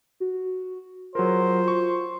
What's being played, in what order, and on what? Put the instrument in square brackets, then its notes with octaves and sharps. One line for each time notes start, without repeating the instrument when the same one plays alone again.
[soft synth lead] F#4
[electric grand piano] F#3 G#4 A#4 [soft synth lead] F4 [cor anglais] C5
[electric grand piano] C#6